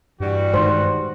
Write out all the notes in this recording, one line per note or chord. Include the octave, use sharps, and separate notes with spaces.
G2 E3 G3 F#4
G#2 D#3 C5